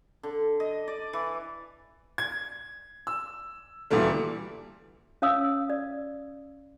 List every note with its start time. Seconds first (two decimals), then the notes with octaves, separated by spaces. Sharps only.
0.23 D3
0.60 D#5
0.88 D5
1.13 E3
2.18 G#6
3.07 E6
3.90 D2 A#2 E3 G3 A3
5.22 C#4 C#5 F5 D#6 E6
5.70 D5